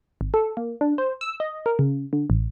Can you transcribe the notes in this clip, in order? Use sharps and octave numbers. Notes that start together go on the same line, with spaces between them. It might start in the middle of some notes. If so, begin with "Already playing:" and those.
G#1
A4
A#3
D4
C5
E6
D#5
A#4
C#3
D3
A1